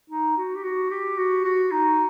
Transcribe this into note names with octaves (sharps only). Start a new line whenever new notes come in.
D#4
F#4
G4
F#4
G4
F#4
F#4
D#4